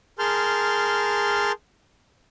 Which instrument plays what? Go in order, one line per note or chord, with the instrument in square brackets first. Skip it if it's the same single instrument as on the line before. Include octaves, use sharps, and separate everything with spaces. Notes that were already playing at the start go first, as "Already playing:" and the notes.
[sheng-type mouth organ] G#4 A#4 A5 C6 F6 G6